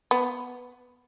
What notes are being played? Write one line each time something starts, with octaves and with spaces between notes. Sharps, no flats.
B3